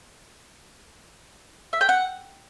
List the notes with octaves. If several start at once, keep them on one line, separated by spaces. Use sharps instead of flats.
E5
G5
F#5